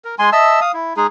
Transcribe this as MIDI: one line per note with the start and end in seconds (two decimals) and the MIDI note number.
0.05 0.15 70
0.19 0.30 56
0.19 0.30 80
0.19 0.30 84
0.32 0.60 75
0.32 0.60 76
0.32 0.60 81
0.32 0.60 88
0.61 0.72 77
0.61 0.72 87
0.74 0.93 64
0.97 1.07 56
0.97 1.07 63
0.97 1.07 68